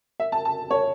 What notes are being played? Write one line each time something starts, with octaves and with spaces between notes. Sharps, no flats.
E5
A5
A5
C#5